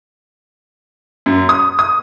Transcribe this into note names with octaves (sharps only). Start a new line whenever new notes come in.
F#2
D#6
D#6